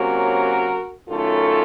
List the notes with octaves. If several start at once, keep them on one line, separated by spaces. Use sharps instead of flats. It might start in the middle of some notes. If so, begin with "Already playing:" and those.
Already playing: C3 F#3 A#3 C#4 F#4 A#4
F#2 D#3 A3 C#4 F4 A4